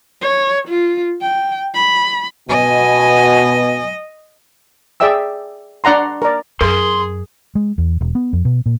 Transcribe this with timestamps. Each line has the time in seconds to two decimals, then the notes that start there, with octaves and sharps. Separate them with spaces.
0.21 C#5
0.68 F4
1.21 G5
1.74 B5
2.49 B2 D#5 G#5
5.00 G#4 D5 E5 G5 E6
5.84 D4 D5 F#5 A#5 C6
6.22 A#4 D5
6.61 F#2 G#4 A#4 C6
7.55 G#3
7.78 E2
8.01 E1
8.15 B3
8.33 F2
8.45 B2
8.66 A#2